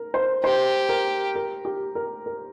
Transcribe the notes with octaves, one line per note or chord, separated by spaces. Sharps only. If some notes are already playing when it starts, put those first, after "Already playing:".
Already playing: A#4
C5
G4 C5
A#4
A#4
G4
A#4
A#4